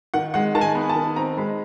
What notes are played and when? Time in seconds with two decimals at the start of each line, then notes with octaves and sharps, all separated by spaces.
0.14 D#3 F#5
0.34 G#3 F#5
0.55 D#3 A5
0.61 G#5
0.75 B3
0.89 A5
0.95 D#3
1.16 C4 A#5
1.37 G#3 B5